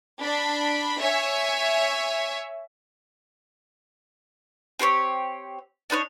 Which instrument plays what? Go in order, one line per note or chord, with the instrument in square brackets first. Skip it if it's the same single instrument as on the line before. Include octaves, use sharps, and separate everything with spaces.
[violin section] D4 B5
C#5 E5 G#5
[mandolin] C4 G4 C5 C#5
D4 D#4 B4 C#5